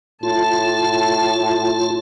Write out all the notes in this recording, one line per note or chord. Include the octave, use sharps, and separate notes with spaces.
A2 F4 A5